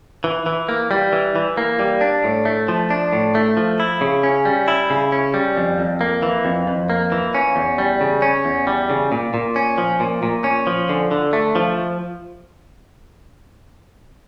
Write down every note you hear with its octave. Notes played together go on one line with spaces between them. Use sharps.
E3
E3
A#3
G3
E3
E3
A#3
G3
D4
A2
A3
F3
D4
A2
A3
F3
E4
C#3
C#4
G3
E4
C#3
C#4
G3
F2
F2
A#3
E3
F2
F2
A#3
E3
C#4
E2
G3
C#3
C#4
E2
G3
C#3
A#2
A#2
C#4
F3
A#2
A#2
C#4
F3
D3
D3
A3
F3